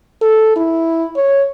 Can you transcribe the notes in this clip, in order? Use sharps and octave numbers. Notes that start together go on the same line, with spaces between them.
A4
E4
C#5